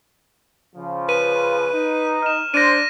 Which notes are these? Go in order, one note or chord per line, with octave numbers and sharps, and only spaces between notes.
C#3 F3
B4 D#7
D#4
F6 E7
D4 C5 A#6 D#7